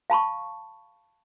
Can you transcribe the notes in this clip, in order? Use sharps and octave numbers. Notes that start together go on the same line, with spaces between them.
F5 A5 B5 C#6